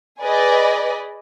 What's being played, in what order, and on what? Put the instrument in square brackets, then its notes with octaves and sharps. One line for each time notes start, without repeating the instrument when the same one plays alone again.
[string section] G#4 B4 D5 D#5 G#5 B5